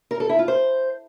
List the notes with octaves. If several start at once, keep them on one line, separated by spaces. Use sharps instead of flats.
A#4
A4
E4
F4
C5